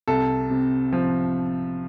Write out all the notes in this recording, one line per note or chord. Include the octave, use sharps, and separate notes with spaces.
C2 A4
C3
F3